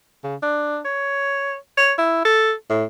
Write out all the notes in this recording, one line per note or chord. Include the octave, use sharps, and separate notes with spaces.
C#3
D4
C#5
C#5
E4
A4
A2